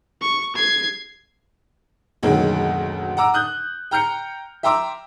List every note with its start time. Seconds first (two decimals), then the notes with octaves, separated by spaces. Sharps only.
0.22 C#6
0.56 G#6 C7
2.23 F#1 D2 B2 D#3 F#3 G#3
3.17 F#5 A#5 D6 E6
3.34 D#6 F#6 G6
3.91 G5 A#5 F6 G6 C#7
4.63 E5 G5 A#5 C6 D6 E6